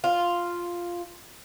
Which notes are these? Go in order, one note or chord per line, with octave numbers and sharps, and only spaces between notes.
F4